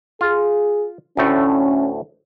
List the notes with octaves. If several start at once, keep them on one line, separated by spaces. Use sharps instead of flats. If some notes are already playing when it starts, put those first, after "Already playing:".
F4 G#4
D2 A2 A3 C#4